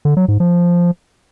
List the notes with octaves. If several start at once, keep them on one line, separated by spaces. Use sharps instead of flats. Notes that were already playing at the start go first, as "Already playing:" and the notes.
D3
F#3
G#2
F3